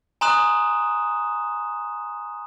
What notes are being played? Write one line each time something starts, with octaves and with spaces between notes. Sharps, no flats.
G#5 A#5 C6 D#6 F#6 E7